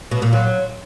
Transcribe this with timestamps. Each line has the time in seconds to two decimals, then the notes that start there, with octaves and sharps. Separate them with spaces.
0.11 B2
0.22 A#2
0.33 F#3